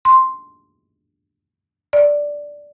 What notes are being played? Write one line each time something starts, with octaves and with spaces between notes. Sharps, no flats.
C6
D5